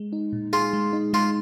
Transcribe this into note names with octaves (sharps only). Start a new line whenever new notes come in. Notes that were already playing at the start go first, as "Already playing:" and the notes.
Already playing: G#3
D#4
A#2
F4 G#4
G#3
D#4
G#3 F4